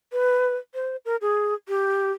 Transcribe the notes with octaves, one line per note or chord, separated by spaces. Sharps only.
B4
C5
A#4
G#4
G4